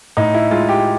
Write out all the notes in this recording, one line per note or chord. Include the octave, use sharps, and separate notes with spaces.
A2 D#4
E4
G#3 F4
G4